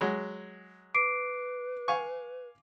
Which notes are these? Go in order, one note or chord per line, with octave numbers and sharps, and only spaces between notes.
F#3 G#3
B4 D6 C7 D7
F5 G#5 C#6